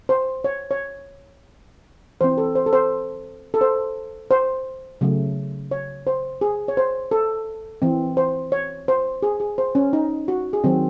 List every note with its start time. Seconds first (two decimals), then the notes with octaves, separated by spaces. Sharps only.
0.09 C5
0.44 C#5
0.71 C#5
2.21 E3 C4 C5
2.38 A4
2.55 C5
2.66 A4
2.73 C5
3.54 A4
3.61 C5
4.31 C5
5.01 C#3 F#3 A3
5.71 C#5
6.07 C5
6.41 G#4
6.68 C#5
6.77 C5
7.11 A4
7.82 E3 C4
8.17 C5
8.52 C#5
8.88 C5
9.23 G#4
9.40 G#4
9.58 C5
9.75 C#4
9.93 D#4
10.28 F#4
10.53 G#4
10.64 D#3 F#3 C4 F#4